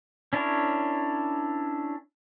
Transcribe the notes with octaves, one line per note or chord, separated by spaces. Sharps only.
C#4 D4 E4 A#4 C#5